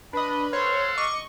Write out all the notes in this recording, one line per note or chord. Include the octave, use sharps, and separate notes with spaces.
D4 B4 D#5 B5
A4 C5 C#5 F5 F#5
D#5 C#6 D6